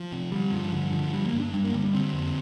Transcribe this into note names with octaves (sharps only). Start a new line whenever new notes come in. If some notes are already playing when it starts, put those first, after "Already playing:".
Already playing: F3
C3
D3 G3
G2 F3
G2 D3
D3 F3
D3 G3
A#3
G2
D4
G2 G3
A#3
D3 G3
G3
D3 C4
F2